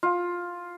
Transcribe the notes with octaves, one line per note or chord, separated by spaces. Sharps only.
F4